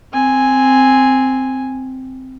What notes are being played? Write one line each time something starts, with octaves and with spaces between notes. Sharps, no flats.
C4 G#5